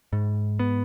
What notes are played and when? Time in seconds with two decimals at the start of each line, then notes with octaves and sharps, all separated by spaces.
0.13 G#2
0.59 B3